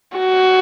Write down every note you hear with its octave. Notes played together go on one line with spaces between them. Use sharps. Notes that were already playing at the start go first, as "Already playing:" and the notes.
F#4